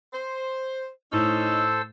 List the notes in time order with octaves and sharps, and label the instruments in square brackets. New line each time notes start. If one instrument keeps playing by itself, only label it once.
[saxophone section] C5
[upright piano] A2 [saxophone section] C#4 D#4 [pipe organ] A4 C5 E6